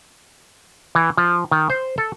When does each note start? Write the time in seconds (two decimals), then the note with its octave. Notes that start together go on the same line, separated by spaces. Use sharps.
0.95 E3
1.18 F3
1.51 D#3
1.70 C5
1.98 A4